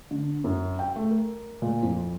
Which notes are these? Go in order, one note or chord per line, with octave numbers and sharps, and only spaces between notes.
D3
F#2
G5
A3
A#4
A#2
F2